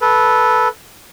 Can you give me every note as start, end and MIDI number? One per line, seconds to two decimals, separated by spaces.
0.01 0.68 69
0.01 0.68 71